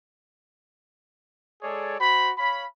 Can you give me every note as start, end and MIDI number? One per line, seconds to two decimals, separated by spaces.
1.63 1.97 56
1.63 1.97 68
1.63 1.97 69
1.63 1.97 73
1.63 1.97 74
2.00 2.32 66
2.00 2.32 72
2.00 2.32 83
2.38 2.64 73
2.38 2.64 77
2.38 2.64 83